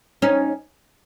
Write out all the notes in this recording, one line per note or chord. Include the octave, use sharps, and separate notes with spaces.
C#4 D#4